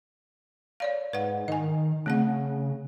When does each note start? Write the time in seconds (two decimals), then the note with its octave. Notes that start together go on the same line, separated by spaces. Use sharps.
0.80 C#5 D5 F5
1.13 G#2 B4 F#5
1.48 D#3 D#5 G#5
2.06 C#3 A3 C4 F#5